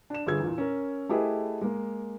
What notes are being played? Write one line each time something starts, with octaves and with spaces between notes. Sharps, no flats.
D4 E7
G1 F4 G#4 E6 G#6
E2 A#2
C#4 A#4
A3 E4 G4 G#4 B4 D#5
G#3 A#3